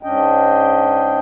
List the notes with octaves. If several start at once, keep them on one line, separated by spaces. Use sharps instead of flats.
G#2 C#4 D4 D#5 G5